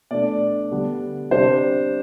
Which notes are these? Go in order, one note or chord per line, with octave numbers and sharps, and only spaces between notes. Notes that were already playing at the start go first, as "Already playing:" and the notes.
B2 A3 D4 D5
D3 G3 B3 D4
C3 G3 D4 C5